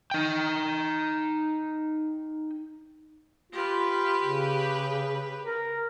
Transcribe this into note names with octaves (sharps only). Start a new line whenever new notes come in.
D#4 G5
F4 G4 B4
C#3
A#4